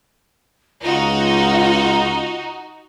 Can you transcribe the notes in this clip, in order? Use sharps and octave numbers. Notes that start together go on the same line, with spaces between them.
C#2 D#4 F4 F#4